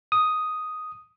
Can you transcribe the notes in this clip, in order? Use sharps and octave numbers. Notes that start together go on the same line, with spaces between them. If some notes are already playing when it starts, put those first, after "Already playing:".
D#6